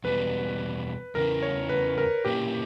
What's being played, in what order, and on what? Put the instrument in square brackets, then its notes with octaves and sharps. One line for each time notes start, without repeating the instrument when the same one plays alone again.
[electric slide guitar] E2 B2 G3 [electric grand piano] B4
[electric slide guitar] E2 C#3 E3 [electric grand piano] A#4
[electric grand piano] C#5
B4
A#4
[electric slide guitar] A#2 A#3 C#4 E4 [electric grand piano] G4